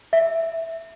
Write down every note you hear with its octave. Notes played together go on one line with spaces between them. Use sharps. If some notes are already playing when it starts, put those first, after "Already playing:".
E5